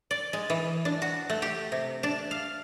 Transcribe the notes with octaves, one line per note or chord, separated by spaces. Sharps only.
D5
G#3
E3
D4
F#4
A3
G4
C3
D4
F5